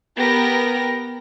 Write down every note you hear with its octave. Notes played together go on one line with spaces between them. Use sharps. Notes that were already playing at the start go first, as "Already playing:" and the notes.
B3 G4 A#4 A#6